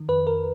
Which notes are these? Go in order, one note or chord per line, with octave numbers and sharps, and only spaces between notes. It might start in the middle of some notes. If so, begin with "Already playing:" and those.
Already playing: D#3
F2 B4
A#4